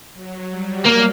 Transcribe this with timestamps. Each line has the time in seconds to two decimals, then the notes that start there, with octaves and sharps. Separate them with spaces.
0.14 F#3
0.50 G3
0.86 A#3